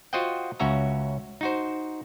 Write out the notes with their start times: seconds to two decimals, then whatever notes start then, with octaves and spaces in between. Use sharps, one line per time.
0.13 F4 F#4 C5 D#5 F#5 G5
0.60 C#2 C#4 F#4 E5 A#5
1.41 D#4 F#4 C5